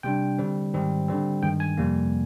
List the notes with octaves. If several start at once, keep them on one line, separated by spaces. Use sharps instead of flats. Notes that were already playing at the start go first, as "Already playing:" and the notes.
C3 G3 D4 G5
D3 G3 C4
G#2 D#3 G3 C4
D3 G3 C4
G2 D#3 G#3 G5
G#5
F2 C3 G3 A#3